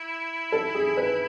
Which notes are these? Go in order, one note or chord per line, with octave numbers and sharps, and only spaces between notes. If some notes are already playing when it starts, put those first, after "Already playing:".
Already playing: E4
A4
G#4
B4